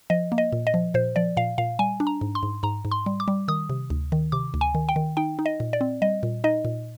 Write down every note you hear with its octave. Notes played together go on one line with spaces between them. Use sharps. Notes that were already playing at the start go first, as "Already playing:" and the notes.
F3 D#5
A#3
D#5
A#2
D#5
F3
A#2 C5
F3 D5
A#2 F5
A#2 F5
G3 G#5
D4
A#5
G#2
C6
G#2
G#2 A#5
G#2
C6
G3
D6
G3
D#3 D#6
C3
D2
D#3
C3 D6
D2
G#5
D#3
G5
D#3
D#4 G5
D#4
D#5
A#2
D5
C4
G3 D#5
A#2
D#4 D#5
A#2